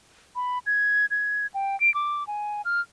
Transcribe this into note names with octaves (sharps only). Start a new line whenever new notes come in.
B5
G#6
G#6
G5
D7
D6
G#5
F6